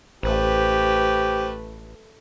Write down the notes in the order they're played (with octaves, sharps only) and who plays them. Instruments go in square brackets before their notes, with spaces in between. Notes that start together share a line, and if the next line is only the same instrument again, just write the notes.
[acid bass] A1 [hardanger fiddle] A3 B4 [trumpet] G4 [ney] C5